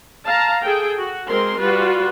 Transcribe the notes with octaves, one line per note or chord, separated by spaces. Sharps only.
F5 A5 A#5
G#4 A4 G5
F#4
G#3 C4 A#4 C6
G3 F4 F#4 B4